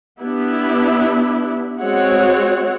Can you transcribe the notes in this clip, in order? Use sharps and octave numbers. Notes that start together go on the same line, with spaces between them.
B3 D4 E4 G4
G#3 C4 F#4 C#5 F#5